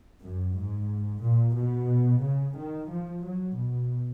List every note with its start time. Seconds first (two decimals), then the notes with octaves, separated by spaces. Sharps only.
0.21 F#2
0.54 G#2
1.22 A#2
1.55 B2
2.22 C#3
2.55 D#3
2.89 F3
3.23 F#3
3.55 B2